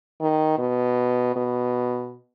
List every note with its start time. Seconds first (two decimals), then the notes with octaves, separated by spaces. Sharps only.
0.21 D#3
0.59 B2
1.36 B2